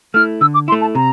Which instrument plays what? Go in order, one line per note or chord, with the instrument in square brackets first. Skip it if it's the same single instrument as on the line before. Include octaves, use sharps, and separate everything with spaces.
[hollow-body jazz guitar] A3 E4 [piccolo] F6
[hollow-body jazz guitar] D3 [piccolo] E6
[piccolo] D6
[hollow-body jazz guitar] E4 [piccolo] C6
[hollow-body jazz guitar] A3
[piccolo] A5
[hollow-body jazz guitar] C3 [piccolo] A#5